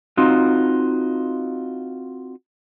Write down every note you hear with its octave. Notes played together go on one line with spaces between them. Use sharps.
C4 D#4 F4 F#4